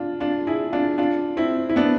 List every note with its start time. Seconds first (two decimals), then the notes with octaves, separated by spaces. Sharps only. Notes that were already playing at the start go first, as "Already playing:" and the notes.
Already playing: D4 F4
0.20 D4 F4
0.47 E4 G#4
0.73 D4 F4
0.98 D4 F4
1.37 C4 E4
1.70 E4
1.76 B3 D4